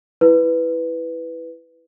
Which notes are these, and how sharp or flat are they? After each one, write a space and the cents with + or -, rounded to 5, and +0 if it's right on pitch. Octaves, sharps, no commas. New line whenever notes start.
E4 +0 B4 +5